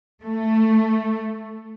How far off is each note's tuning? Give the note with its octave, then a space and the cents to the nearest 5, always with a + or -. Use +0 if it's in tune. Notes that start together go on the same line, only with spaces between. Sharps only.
A3 +10